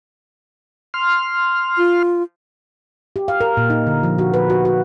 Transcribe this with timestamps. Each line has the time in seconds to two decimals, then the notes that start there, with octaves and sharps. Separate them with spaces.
0.94 C6 F6
1.78 F4
3.16 G4
3.28 F5
3.41 A#4
3.57 A#2
3.70 D#4
3.87 D3
4.03 F3
4.18 F#4
4.34 B4
4.50 F#4
4.65 F#4